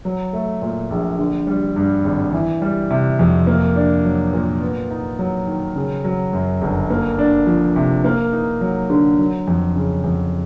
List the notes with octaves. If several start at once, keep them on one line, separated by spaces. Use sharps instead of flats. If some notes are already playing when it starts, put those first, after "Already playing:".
F#3
A3
A#2
A#1
D3
G3
G2
G#1
E3
G3
C3
F2
A#3
D4
F#3
A#2
B3
D#4
F#3
D#3
C#3
F#3
F#2
G1
A#3
D4
F3
C3
A#3
D#4
F#3
D3
F#3
F2
C#3
F2